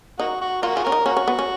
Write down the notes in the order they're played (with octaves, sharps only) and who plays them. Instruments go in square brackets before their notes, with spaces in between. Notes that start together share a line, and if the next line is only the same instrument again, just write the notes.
[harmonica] A#3 F#4 [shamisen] D#4
[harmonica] F#4
[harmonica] A#3 F#4 [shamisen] F4
[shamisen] F4 [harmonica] G#4
[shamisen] C#4 [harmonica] A#4
[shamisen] D#4
[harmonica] A#3 F#4 [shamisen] C#4
[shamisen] C#4
B3
C#4